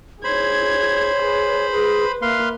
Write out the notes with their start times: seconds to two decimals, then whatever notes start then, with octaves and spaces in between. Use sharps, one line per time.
0.24 G#4 C5 C#5 B5 G#6
1.21 G#4 B4
1.72 G#4 B4
2.22 A#3 B4 E5 F5 C6